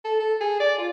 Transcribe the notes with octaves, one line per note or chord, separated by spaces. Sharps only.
A4
A4
G#4
D5
F4